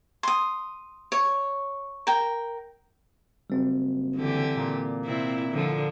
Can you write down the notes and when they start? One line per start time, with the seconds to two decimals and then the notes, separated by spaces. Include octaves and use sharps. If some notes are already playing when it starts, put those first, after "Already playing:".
0.23 C6 D#6
1.12 C#5
2.07 A#4 G5
3.50 F#1 G3 C4
4.17 D3 E3 G4
4.56 A#2
5.06 C3 C4 E4
5.52 D3 F3